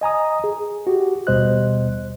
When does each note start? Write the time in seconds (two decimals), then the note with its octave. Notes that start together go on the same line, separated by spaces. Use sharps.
0.01 D#5 G#5 A#5 D#6
0.44 G#4
0.87 F#4 G4
1.27 D#2 B2 G3 C5 D#5 F#6